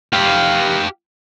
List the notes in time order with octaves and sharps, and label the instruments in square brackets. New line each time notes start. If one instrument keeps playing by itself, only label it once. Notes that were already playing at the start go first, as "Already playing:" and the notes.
[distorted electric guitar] G4 F5